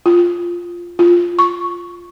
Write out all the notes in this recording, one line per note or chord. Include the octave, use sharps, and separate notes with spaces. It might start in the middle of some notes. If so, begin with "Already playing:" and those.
F4
F4
C#6